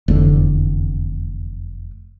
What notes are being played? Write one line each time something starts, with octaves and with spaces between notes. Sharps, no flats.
F1 E2 D3